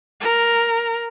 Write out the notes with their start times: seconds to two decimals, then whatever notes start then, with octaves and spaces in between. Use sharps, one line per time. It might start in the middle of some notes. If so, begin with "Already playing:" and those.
0.21 A#4